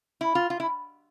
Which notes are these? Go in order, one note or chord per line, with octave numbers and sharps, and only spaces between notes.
E4
F4
F4
E4